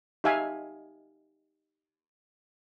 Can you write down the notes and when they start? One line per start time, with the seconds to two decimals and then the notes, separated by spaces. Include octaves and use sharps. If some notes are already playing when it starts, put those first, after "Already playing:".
0.24 D#4 G4 E5 F5 G#5